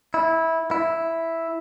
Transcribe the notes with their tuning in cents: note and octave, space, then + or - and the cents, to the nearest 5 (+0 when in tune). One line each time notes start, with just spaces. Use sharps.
E4 -15
E4 +0